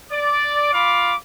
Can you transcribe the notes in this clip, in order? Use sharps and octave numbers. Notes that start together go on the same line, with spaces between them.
D5 D6
F4 F5 B5 D6